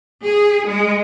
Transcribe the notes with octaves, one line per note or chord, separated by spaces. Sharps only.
G#4
G#3